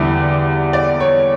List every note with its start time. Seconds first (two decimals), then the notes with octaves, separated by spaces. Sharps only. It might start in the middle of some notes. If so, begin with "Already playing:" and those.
Already playing: E2 D3 G3 E5
0.73 D5
1.00 C#5